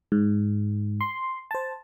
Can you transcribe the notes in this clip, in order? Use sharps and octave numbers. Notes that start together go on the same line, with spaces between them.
G#2
C6
C5 A5